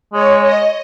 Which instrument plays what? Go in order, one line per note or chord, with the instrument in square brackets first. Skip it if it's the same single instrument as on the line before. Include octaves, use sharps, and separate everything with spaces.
[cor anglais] G#3 [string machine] C#5
[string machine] D#5